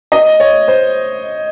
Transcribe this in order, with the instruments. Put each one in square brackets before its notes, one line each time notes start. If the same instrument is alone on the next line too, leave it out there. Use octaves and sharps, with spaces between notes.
[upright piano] D#5
C#5
C5